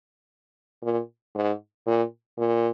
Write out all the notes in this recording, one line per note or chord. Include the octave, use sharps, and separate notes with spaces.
A#2
G#2
A#2
A#2